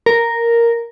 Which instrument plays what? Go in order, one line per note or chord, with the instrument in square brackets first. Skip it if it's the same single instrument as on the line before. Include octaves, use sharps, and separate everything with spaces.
[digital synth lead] A#4